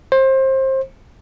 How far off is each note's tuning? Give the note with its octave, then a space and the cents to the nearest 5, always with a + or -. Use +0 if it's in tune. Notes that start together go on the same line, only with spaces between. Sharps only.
C5 +25